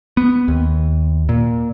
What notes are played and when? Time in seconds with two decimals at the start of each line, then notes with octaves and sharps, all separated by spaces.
0.17 B3
0.48 D#2
1.29 A#2